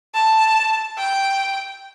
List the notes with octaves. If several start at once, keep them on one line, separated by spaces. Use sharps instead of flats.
A5
G5